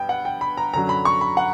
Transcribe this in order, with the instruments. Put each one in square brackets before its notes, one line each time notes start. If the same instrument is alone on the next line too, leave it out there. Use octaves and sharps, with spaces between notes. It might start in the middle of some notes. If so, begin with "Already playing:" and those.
Already playing: [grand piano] G2 B3 G5
F#5
G5
B5
A#5
F#2 D3 F#3 A#5
B5
C#6
B5
F#5